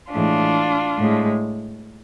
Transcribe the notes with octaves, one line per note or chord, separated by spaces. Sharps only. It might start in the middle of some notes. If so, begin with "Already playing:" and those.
A2 E3 G#3 D4 F4
A2 G#3